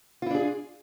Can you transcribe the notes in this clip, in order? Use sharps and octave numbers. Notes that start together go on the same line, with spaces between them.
D4 E4 F4 G#4